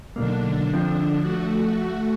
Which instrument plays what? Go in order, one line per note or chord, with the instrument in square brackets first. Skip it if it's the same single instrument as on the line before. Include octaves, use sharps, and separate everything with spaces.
[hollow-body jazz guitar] B1 G#2 A#3 [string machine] D3 D4
[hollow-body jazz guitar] F3 C4
[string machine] A3 F#4